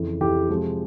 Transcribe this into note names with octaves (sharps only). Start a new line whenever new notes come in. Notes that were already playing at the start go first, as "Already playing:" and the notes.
Already playing: F2 C#3 E3
F2 C#3 E3 G4 G5
C3 F3 G#3